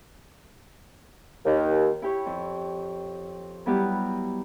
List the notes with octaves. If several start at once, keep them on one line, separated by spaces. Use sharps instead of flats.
D#2
E4 G4 C#5
F2
F#3 G3 B3 E4 F#4 G4